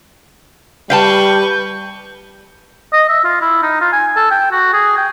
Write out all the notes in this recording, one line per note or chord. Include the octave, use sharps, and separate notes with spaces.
G3 B4 F5 G5 A5 C#6 G6
D#5
E5
F4
E4
D#4
F4
G#5
A4
G5
F#4
G#4
G5